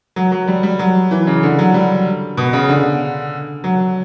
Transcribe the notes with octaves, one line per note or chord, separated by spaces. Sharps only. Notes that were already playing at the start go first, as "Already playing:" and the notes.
F#3
F#3
G3
G3
F#3
E3
C#3
D3
F#3
G3
B2
C#3
D3
F#3